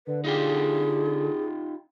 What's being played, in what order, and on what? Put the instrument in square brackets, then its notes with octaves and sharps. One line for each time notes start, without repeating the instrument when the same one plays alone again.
[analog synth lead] D3 [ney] B4
[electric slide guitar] D#4 F4 G4 [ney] G#4